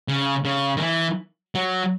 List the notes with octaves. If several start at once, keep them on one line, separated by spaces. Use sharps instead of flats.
C#3
C#3
D#3
E3
F#3